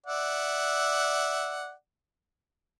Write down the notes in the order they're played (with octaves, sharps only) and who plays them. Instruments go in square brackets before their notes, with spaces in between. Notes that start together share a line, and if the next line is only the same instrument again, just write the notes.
[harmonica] D5 E5 F#5